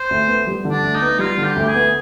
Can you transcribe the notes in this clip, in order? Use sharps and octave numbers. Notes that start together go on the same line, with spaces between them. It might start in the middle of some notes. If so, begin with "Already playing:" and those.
Already playing: C5
D2
B3
G3
D3
D4
D2
D#4
B3
G3 F4
D3
G4
D2
G4
G#4
B3